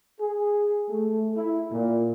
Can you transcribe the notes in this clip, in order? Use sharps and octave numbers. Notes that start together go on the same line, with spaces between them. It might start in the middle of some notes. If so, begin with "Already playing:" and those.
G#4
A3
E4
A#2